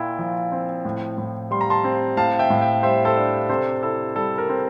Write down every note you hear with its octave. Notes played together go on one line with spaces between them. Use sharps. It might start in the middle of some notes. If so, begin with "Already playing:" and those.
Already playing: A#2 E4 G5
F3
C4
A2
A2
G3 C6
A#5
A5 C6
C4
A2 F5 A5
E5 G5
A2
E5 G5
G3 C5 E5
A4 C5
D4
C3 A4 C5
E4 A4
G3 A4
A#4
C4